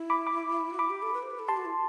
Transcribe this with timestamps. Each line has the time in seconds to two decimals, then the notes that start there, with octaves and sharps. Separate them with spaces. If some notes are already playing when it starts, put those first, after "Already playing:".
Already playing: E4
0.10 B5 D6
0.27 B5 D6
0.73 F#4
0.79 E4 B5 D6
0.90 G4
1.02 A4
1.14 B4
1.23 C5
1.31 B4
1.39 A4
1.48 G4 A5 C6
1.57 F#4
1.65 E4